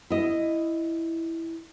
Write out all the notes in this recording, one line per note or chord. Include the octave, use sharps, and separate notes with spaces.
E4 D#5